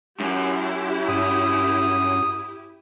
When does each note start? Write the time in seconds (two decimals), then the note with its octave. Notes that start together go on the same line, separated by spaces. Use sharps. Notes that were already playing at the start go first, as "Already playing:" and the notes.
0.20 F#2 E4 G4
1.08 G2 D#6